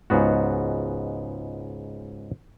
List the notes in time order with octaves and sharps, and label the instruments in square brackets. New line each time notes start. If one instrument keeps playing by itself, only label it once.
[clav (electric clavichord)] C#2 G#2 B3 F#4